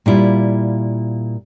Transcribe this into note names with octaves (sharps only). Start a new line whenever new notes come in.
A#2 G3 E4 F4